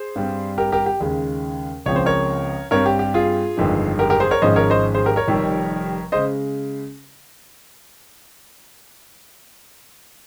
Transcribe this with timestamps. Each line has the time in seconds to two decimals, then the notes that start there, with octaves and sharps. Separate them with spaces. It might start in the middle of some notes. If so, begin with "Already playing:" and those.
Already playing: G#4 C5
0.16 G2 G3 C4
0.58 G4 A#4
0.72 G4 A#4
0.86 G4
1.00 D#2 C#3 G#3
1.86 C#2 C#3 F3 C4 C#5
1.96 C5
2.06 A#4 C#5
2.71 G2 G3 C4 A#4 C#5
2.86 G4
2.99 G4
3.14 F4 G#4
3.57 G1 F2 D#3 G#3
3.99 G4 A#4
4.10 G4 A#4
4.20 G#4 C5
4.31 A#4 C#5
4.42 G#1 G#2 F3 G#3 C#4 C5 D#5
4.56 A#4 C#5
4.70 C5 D#5
4.95 G#4 C5
5.06 G4 A#4
5.16 A#4 C#5
5.28 F1 F2 D#3 G3
6.12 C#3 G#3 C5 D#5